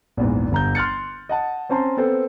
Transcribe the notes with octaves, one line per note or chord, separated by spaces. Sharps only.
A#1 E2 G#2
G1 A#5 G6
C6 F6 F#6 A6 C#7
D#5 F#5 A5
C4 C#4 C5 A5 A#5 C6
B3 C4 A4 C5